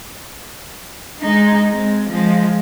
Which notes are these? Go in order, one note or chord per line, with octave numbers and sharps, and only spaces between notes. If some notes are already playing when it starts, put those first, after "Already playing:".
G#3 D#4
G#3 C4
F3 G#3